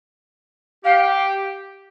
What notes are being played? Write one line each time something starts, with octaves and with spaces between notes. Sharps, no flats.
G4 F5